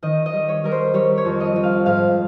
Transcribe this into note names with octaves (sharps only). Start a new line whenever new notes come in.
D#3 D#5
D#5
G3
C#5
G3 A#4
C5
G3 C#5
C#5
F2
D#5
F2
F5
G#2 F5